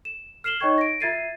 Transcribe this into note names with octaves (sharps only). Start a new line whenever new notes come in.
E7
F6 C7 E7 F#7 G7
D#4 C#5 D#5 G5 C#6 G#6
A#6 D7
F4 E5 G#6 A6 C7 D#7